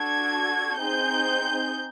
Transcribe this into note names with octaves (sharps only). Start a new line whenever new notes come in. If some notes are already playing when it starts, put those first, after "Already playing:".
Already playing: D4 F#4 A4 G#6
C4 D#4 G#4 G6